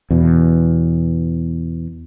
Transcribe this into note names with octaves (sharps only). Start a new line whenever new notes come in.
E2 B2